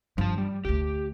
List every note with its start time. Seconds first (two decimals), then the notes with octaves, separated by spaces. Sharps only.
0.18 G2 F3 A5
0.38 G3
0.65 D2 D3 G4